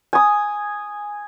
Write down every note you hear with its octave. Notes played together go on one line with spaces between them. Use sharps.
G#5 D#6